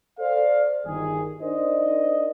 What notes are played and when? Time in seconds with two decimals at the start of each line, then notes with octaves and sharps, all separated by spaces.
0.19 A4 C5 D5 F5
0.85 G1 D#3 G#4
1.41 D4 D#4 A#4 C5 D5 D#5